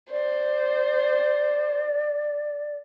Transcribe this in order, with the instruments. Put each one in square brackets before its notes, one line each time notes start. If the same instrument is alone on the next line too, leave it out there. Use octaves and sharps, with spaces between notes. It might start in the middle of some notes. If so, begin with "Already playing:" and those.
[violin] C5 [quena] D5